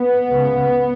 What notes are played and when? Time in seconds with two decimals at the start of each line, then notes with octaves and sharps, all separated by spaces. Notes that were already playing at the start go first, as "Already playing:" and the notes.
Already playing: B3
0.28 C#2 C#3